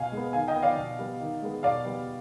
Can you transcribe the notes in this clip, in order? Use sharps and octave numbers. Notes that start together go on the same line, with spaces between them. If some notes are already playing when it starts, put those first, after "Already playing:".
Already playing: B2 F5 G#5
G#3
B3
D#3 F5 G#5
D#5 G5
B3
D5 F5
B2
G3 B3
D#3
G#3 B3
B2 D5 F5
G3 B3